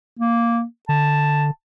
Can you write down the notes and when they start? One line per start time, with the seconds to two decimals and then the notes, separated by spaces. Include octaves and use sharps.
0.19 A#3
0.89 D3 A5